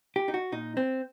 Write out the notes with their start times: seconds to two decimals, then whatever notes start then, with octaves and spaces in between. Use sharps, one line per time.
0.16 G4
0.28 D#4
0.34 F#4
0.52 A#2 D#4
0.77 C4